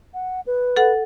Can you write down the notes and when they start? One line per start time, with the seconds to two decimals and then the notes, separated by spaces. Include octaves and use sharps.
0.14 F#5
0.47 B4
0.76 A4 F#5